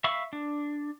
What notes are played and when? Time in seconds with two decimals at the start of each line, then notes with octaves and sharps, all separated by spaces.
0.04 E5 F5 B5 C#6 E6
0.33 D4